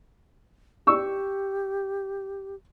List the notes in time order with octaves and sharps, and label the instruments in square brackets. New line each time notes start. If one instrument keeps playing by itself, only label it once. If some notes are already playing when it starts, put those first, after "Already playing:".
[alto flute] G4 [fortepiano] C#6 E6